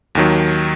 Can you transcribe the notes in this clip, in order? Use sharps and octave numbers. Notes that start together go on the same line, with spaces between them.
D#2 D#3 F#3